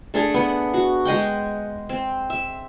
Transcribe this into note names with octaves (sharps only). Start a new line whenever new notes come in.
A3 D4 G#4
B3 F#5
F#4
G#3 D#5 F#5 G5
C4
E5